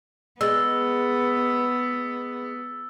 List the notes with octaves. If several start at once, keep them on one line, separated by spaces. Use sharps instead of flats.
G#3 B3 E6 A6